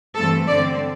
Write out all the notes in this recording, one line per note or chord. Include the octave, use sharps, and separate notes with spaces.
G2 E3 A3 C4 A4
G2 D3 A3 C4 D5